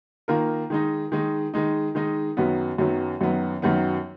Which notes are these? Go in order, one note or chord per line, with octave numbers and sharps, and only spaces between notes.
D#3 A#3 F4 A#4
D#3 G#3 D#4
D#3 G#3 D#4
D#3 G#3 D#4
D#3 G#3 D#4
F#2 D#3 F#3 B3
F#2 D#3 F#3 B3
F#2 D#3 F#3 B3
F#2 D#3 F#3 B3